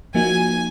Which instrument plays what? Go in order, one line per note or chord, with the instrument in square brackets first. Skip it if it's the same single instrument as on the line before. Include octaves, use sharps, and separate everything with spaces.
[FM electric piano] F3 A#3 D#4 F#4 [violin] G#5